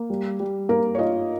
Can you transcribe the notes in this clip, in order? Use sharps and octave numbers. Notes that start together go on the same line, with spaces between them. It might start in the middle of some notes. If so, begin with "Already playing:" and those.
Already playing: A#3
G3
G3
A#3 A#4
C#5
F4 D#5